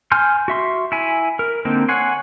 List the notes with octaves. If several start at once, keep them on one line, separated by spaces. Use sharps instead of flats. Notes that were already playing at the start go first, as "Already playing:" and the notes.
G#5 C6 F6 G6
F#4 E5 C6
E4 G#5
A#4
D3 A#3 C4 D#4
C#5 F#5 G#5 C6